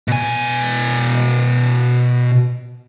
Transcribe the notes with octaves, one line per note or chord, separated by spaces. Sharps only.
B2 G#5